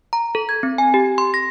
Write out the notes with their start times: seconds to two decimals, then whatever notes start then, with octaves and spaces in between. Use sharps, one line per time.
0.13 A#5
0.35 A4
0.49 G#6
0.63 C4
0.78 G#5
0.94 G4
1.18 C6
1.34 A#6